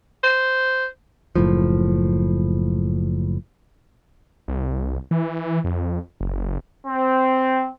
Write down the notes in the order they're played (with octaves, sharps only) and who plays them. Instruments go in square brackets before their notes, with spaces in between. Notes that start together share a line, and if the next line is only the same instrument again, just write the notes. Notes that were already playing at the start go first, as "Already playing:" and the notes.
[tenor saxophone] C5
[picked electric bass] F#1 A2 F3
[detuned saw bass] C2
E3
F2
F#1
[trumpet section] C4